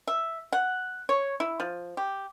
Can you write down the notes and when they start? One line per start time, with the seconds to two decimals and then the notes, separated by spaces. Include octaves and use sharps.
0.08 E5
0.53 F#5
1.09 C#5
1.40 E4
1.60 F3
1.97 G4